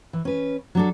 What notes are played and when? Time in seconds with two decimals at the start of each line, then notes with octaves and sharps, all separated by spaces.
0.13 E3
0.25 C#4 B4
0.75 F#3 D4 A4